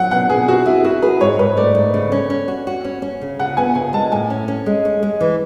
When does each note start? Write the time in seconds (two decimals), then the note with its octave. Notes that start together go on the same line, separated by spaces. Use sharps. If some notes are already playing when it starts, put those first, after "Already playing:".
Already playing: F#3 F#5
0.11 B2 F#5
0.29 B2 G#4
0.48 E4 F#4
0.66 E4 G#4
0.84 E4 F#4
1.02 G#4 B4
1.20 G#2 C#5
1.39 G#2 B4
1.57 A3 D5
1.75 G#2
1.94 C#3
2.12 C#4
2.30 C#4
2.48 F#4
2.67 F#4
2.85 C#4
3.02 C#4
3.21 C#3
3.39 C#3 F#5
3.57 B3 G#5
3.75 C#3 G#5
3.93 G#3 A5
4.12 A2 G#5
4.30 C#4
4.48 C#4
4.66 G#3
4.85 C#4
5.03 G#3
5.21 E3